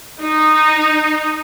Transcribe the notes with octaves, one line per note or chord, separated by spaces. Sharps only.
D#4